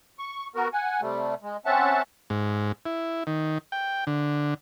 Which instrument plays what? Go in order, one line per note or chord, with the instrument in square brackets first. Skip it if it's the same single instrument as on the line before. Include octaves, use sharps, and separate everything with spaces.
[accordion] C#6
B3 F#4 A#4
F#5 G#5
C3 G3 A3
G#3
C4 C#4 E5 F#5 A5
[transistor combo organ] G#2
E4
D#3
G5
D3